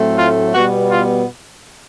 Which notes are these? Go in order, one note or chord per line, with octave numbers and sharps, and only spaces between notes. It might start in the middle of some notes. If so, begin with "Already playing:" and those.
Already playing: A2 F#3 A3 C4
F4
B2 G3 B3 F#4
F4